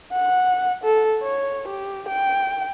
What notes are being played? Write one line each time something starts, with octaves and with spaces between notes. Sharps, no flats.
F#5
A4
C#5
G4
G5